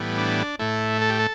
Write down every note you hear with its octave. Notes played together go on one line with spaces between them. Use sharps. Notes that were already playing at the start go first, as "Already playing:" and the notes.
Already playing: A2 E3 G3 B3
D4
A2 A3 E4
A4
G4
A4